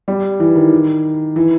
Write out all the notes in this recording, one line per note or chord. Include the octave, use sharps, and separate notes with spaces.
G3
E3
D#3
E3